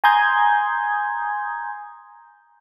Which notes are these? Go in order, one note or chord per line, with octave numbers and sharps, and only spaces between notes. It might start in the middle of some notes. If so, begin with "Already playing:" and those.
G#5 A#5 C6 D#6 G6 G#6